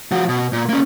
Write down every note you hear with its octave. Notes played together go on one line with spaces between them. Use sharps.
F3 F#4
B2
A#2
A#3 C#4